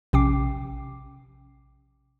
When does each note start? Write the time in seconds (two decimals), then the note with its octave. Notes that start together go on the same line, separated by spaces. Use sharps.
0.13 A#1 C3 C#4 G5 D6 C7